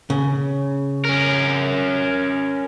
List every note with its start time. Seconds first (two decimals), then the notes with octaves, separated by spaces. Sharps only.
0.10 C#3
1.05 C#4 A#4